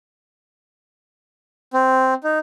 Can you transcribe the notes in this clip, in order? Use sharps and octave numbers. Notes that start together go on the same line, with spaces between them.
C4
D#4